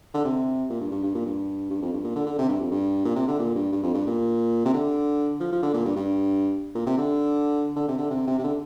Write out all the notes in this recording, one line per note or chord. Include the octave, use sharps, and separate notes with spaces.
D3
C3
A#2
G2
G2
G2
A#2
G2
G2
F2
G2
A#2
D3
D3
C3
G2
F2
G2
A#2
C3
D3
A#2
G2
G2
F2
G2
A#2
C3
D3
F3
F3
D3
A#2
G2
G2
A#2
C3
D3
D3
C3
D3
C3
C3
C3
D3